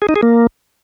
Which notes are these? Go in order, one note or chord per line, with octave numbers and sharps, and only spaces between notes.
G#4
D#4
G#4
A#3